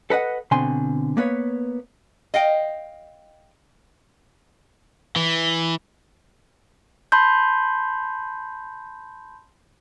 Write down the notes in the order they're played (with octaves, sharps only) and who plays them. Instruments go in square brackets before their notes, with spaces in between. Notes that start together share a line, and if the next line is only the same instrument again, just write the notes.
[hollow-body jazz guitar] A4 B4 D#5 F#5
B2 D3 C4 G#5 C6
A#3 B3 B4 C#5
[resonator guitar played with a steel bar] D#5 F5 G5
[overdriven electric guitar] E3
[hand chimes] A5 B5 C6 G6